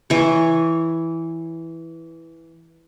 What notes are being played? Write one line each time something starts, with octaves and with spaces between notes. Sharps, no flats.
E3 C#5